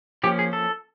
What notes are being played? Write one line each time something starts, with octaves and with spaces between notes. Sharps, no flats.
F3 A#3 C#4 G4
G#4
A4